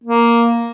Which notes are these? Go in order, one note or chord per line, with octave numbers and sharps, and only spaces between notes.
A#3